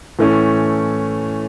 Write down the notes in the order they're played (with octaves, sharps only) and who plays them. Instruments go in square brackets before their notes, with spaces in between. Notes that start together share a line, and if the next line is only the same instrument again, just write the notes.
[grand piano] A2 E3 A3 C#4